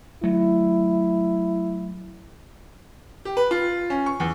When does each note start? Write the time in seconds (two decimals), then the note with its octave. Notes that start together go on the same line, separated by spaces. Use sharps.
0.23 F#3 A3 E4
3.25 G4
3.37 B4
3.51 F4
3.90 C#4
4.06 C#6
4.20 E2